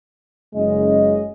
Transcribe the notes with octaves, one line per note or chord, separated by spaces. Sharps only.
F#1 C#3 G#3 D#5